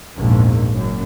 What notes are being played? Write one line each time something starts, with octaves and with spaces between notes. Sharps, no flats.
A#1 E2 G#2
F#1 F#2